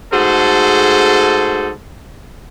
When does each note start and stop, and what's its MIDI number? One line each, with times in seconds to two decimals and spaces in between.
0.12 1.71 44
0.12 1.71 57
0.12 1.71 66
0.12 1.71 68
0.12 1.71 69
0.12 1.71 72